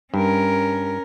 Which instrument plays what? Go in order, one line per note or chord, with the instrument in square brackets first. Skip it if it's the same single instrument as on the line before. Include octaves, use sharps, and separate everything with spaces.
[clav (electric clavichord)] G2 [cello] C#4 A#4